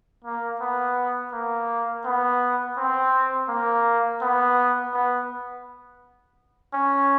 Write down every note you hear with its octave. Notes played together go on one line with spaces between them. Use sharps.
A#3
B3
A#3
B3
C4
A#3
B3
B3
C#4